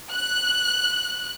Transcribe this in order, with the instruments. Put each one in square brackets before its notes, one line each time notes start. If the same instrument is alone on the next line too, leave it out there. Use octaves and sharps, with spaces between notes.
[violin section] F#6